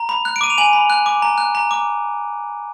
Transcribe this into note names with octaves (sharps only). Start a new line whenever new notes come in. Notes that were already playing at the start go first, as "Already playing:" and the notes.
Already playing: A#5
B5
F#6
D7
D6 D#7
F7
G#5 D#7 F#7
B5
F#6
D6
A#5
F#6
A#5
D6